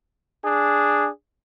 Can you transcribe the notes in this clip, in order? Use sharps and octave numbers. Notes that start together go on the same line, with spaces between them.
D4 G#4